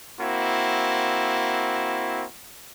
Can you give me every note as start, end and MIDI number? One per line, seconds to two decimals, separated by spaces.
0.20 2.25 58
0.20 2.25 60
0.20 2.25 64
0.20 2.25 66